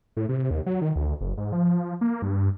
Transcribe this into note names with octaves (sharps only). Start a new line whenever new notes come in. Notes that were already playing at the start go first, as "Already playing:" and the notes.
A2
C3
D#2
F#3
D#3
D2
F#1
G#2
F3
A#3
G2